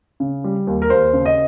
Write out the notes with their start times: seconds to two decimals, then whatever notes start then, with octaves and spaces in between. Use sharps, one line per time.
0.20 C#3
0.44 G3
0.67 D#2
0.82 A#4
0.90 D#2 C5
1.13 C#3
1.26 D#5